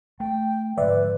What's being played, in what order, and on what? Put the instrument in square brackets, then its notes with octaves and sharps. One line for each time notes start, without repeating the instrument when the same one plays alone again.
[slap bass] A3 [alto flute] G5
[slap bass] G#2 D3 F3 [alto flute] B4 [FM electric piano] D5 E5